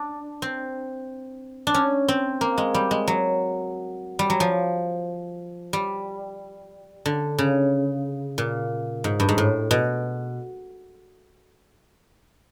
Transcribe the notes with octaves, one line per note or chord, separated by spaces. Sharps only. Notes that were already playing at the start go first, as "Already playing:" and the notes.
Already playing: D4
C4
D4
C#4
C4
A#3
G#3
G3
G#3
F#3
G3
F#3
F3
G3
D3
C#3
A#2
G#2
G2
G#2
A2
B2